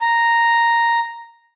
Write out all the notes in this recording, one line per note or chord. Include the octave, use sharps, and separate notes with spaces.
A#5